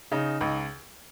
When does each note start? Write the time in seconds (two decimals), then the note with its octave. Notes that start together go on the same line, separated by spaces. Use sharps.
0.12 C#3 D#4
0.41 C#2 D#4